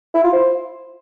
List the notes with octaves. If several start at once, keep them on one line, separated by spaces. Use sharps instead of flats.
E4
F4
C5